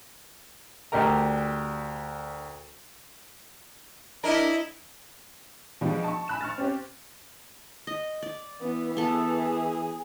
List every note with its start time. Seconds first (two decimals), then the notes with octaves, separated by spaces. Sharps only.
0.92 D2 D4 G4 A#4 A#5
4.24 D4 E4 A#4 D#5
5.81 B2 F3 G3 G#3
6.04 A5 C#6
6.28 G#5 B5 F#6 E7
6.41 C#6 F6 A6
6.58 C4 C#4 G4
7.87 D#5
8.22 D5
8.61 E3 B3
8.97 B3 G#4 A4